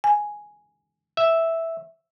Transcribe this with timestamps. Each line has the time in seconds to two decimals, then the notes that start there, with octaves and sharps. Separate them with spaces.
0.04 G#5
1.17 E5